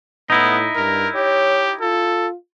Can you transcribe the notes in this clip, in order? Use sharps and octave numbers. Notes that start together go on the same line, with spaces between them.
A2 B3 D#4 E4
G2 A#4
G4 C#5
F4 A4